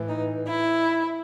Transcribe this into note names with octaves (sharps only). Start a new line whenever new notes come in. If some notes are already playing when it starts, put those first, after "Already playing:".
Already playing: A2 E3
D#4
E4